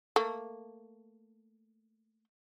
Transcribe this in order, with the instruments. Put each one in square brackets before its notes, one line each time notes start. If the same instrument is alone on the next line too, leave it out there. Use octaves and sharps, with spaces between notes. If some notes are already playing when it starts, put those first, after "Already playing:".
[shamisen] A3 A#3